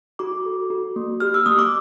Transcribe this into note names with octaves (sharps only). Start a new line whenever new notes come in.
F#4 D6
A4
F#4
A#3
G4 F6
E6
A#3 D#6
D6